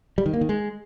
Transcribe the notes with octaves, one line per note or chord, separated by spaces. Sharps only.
G3
D#3
A#3
D#3
G#3